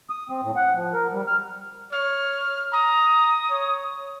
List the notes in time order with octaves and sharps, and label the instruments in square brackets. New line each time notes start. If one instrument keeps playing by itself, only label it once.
[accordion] D#6
C4
A2
F#5
F3
A#4
G3
F6
[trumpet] C#5 [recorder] F6
[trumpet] A#5 [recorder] D#6
[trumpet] C#5